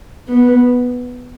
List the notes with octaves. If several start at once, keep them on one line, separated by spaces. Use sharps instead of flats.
B3